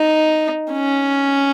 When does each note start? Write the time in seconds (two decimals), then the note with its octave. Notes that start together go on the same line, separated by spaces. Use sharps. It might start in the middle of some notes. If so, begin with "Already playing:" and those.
Already playing: D#4
0.72 C#4